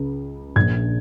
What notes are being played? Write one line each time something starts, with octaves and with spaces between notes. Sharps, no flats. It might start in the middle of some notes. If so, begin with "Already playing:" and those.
Already playing: C#2 C#3
A#1 A#2 F3 G#6